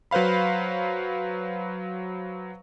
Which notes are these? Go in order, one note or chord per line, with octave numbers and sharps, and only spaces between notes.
F#3 B4 C5 F5 B5